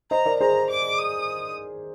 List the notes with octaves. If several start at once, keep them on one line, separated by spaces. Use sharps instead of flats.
C5 D#5 A#5
A#4 D5
G#4 C5 A#5
D6
D#6